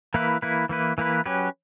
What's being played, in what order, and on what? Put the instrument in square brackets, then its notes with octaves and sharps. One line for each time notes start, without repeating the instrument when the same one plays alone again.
[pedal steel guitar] E3 A#3 E4 B4
E3 A#3 E4 B4
E3 A#3 E4 B4
E3 A#3 E4 B4
F#3 C#4 G4 B4